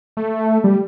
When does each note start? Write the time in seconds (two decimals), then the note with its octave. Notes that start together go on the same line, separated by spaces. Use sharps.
0.17 A3
0.64 G3